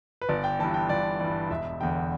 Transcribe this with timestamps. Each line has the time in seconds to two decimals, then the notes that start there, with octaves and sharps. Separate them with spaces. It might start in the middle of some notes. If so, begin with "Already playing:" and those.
0.22 B4
0.29 G1 D5
0.44 G5
0.59 G2 E3 A5
0.74 G5
0.89 G1 D5
1.20 G2 E3 D5
1.50 E1 E5
1.81 E2 D3 G5